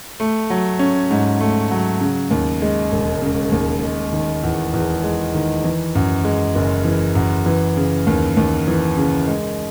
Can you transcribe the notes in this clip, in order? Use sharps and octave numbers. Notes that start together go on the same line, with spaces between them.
A3
F#3
C#4
G#2
A3
F#3
C#3
D#2
G#3
E1
C#3
D#2
G#3
D#3
E2
E2
G#3
D#3
E3
F#2
G#3
F#1
E3
F#2
E3
C#3
D#2
D#2
E3
C#3
G#3